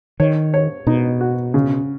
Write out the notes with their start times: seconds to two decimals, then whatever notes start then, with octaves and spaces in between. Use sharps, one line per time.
0.20 D#3 C#5
0.54 C#5
0.87 B2 D#4
1.21 F#4
1.54 C#3